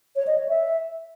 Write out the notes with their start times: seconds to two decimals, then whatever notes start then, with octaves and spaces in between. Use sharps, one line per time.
0.16 C#5
0.27 D#5
0.38 C#5
0.49 E5